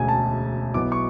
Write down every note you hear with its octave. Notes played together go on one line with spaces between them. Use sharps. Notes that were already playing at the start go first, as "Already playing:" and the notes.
Already playing: E1 D2 C#3 G#5
A5
B1 B2 F#3 B3 E4 D6
C#6